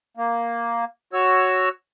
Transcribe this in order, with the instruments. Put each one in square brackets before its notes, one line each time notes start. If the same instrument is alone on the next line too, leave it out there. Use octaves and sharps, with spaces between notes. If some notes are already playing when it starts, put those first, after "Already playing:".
[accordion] A#3
F#4 C#5 E6